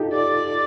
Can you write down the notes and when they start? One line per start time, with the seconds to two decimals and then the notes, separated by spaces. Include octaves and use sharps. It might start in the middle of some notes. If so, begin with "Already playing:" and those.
Already playing: D#4 F4 G4 A4
0.13 D5